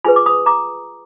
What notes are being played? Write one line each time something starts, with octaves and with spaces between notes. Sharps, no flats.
F4 G#4 B4 G#5 B5
D6
B5 D#6
A#5 D6